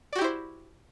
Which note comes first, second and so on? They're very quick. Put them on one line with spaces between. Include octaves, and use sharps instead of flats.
D5 F#4 G4 E4 C5